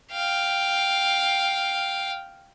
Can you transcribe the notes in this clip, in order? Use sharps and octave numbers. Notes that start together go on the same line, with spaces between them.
F5 G5